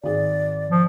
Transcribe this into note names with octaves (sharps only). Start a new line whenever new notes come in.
G#1 G#4 D5
F3